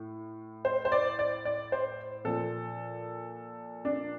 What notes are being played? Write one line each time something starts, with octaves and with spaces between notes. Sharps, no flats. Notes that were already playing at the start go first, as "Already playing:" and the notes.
Already playing: A2
C5
C5
D5
D5
D5
C5
A#2 F3 A4
D4